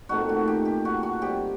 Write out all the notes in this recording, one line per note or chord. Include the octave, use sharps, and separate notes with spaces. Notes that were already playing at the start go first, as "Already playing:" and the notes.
A#2 A3 C4 D#4 F#4
F#4
G4
G4
F#4
F#4
C3 G3 C4 G4